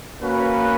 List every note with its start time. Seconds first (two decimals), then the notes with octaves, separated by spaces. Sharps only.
0.20 A#3 C#4 F#4 B4